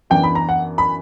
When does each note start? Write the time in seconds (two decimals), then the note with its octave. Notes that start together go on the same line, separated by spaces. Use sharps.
0.10 F#2 E3 B3 D4 G5
0.23 B5
0.35 A#5
0.49 F#5
0.78 B5